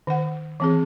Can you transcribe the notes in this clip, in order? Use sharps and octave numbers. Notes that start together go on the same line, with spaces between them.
D#3 F#5
E3 C4 G#4